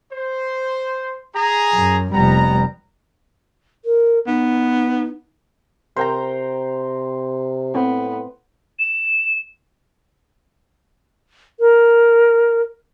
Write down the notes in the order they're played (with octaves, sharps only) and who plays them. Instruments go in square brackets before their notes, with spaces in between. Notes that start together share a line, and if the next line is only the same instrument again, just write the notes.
[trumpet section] C5
G#4 A#5
[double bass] F#2
[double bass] F1 G3 [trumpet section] B3 A#5
[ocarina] A#4
[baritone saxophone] B3 [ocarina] D#4
[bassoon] C3 [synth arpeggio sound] A#4 [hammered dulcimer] C5 G5 A#5
[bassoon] A2 [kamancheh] B3 [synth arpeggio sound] C4
[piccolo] E7
[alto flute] A#4